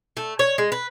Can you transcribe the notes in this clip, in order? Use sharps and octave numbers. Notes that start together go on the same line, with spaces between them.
A3
C#5
G#3
B4